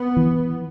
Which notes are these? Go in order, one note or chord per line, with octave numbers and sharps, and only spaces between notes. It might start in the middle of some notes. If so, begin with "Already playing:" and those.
Already playing: B3
E3